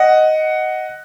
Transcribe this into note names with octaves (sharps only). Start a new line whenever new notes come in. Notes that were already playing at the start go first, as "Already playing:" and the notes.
Already playing: D#5 F#5